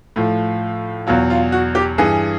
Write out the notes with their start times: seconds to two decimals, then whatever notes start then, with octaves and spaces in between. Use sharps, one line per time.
0.16 A2 F3
1.07 E2 B2 F#3 F4
1.30 F4
1.52 F#4
1.75 G4
1.98 G2 E3 G#4